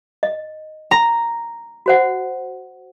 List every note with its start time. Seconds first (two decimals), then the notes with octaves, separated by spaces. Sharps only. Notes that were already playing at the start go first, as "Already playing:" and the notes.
0.23 D#5
0.91 A#5
1.86 F#4 C5 F#5